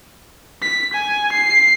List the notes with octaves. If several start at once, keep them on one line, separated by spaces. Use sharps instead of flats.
B6
G#5
C7